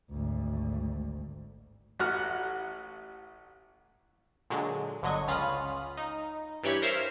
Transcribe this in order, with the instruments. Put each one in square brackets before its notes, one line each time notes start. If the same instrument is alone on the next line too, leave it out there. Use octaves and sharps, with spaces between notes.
[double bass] G#1 D2
[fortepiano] A1 F#4 F#5 F6 F#6
[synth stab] A#2 D3 F#3 G#3
G1 D3 F#3 D#5 C#6
C#2 C#4 F4 F5 B5 D#6
D#4
G2 E3 G4 C#5 B5 G#6
A#4 C5 C#5 E5 F5